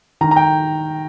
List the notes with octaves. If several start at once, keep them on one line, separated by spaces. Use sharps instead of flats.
D#3 A#5
A#5
G5